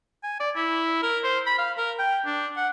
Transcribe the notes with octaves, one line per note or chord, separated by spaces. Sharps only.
G#5
D5
E4
A#4
C5
B5
F5
A#4
G5
D4
F#5